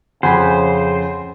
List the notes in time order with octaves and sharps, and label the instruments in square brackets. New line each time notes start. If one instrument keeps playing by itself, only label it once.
[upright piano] F2 [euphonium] C#3 [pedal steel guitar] C5 [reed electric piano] F#5 G#5 B5